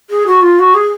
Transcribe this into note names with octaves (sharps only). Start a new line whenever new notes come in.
G#4
F#4
F4
F#4
G#4